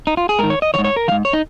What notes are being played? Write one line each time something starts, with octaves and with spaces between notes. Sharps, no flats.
D#4
F4
G#4
G#2 D#3 A#4
C#5
D#5
D#3 C#5
G#2
C#5
A#4
D#3 F5
G#2
C#5
D#4